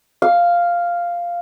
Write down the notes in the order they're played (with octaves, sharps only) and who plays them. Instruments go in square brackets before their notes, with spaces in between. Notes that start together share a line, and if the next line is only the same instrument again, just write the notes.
[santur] F5